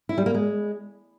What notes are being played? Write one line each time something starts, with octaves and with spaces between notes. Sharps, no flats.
E4
G3
A#3
G#3